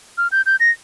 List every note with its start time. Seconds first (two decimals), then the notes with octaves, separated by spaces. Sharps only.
0.18 F6
0.32 G6
0.46 G6
0.60 A#6